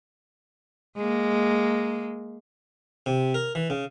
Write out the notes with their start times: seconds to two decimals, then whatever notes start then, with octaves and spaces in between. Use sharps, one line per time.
0.97 G#3 A#3
3.06 C3
3.34 A#4
3.55 E3
3.70 C#3